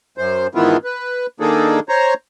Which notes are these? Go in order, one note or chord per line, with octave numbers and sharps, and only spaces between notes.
F#2 C5
G#2 D#3 E3 B3 E4 F4
B4
D#3 A#3 D4 D#4 G#4 A4
C5 C#5 A#5